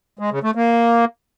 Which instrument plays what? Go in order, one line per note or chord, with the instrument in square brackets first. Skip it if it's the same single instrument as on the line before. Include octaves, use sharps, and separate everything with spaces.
[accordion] G#3
C#3
A3
A#3